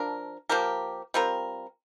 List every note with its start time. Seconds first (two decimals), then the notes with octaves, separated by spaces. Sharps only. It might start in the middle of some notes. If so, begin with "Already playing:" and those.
Already playing: F3 D4 A#4
0.49 F3 A#3 G4 A#4
1.14 G3 C4 F4 A#4